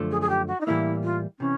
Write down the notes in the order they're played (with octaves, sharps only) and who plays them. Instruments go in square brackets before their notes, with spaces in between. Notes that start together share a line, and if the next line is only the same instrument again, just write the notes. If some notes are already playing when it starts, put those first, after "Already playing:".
Already playing: [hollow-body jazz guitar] F#2 D3 F3 A3
[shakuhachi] G#4
G#4
G4
F#4
D#4
[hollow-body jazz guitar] A2 E3 G3 A#3 [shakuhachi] E4
[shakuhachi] F4
[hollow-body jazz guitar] C3 E3 [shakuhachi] C#4